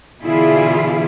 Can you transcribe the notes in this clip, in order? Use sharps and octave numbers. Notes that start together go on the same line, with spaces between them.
B2 D3 E3 E4 F4 G#4